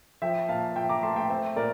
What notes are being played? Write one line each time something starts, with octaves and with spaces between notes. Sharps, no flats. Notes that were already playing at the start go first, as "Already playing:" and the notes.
F3 E5 G5
A#2 F5 A5
F3 E5 G5
A#5 D6
A3 A5 C6
E5 G5
C4 E5 G5
A#2 A#4 D5